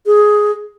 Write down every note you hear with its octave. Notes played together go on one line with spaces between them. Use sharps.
G#4